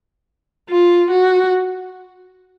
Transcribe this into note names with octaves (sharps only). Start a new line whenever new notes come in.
F4
F#4